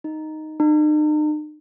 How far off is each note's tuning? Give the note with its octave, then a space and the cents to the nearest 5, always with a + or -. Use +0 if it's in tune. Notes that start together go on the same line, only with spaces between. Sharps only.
D#4 +0
D#4 -45